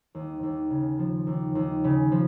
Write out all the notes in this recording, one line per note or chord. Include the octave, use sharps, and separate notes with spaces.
D#2
D#2
C#3
F3
D#2
D#2
C#3
F3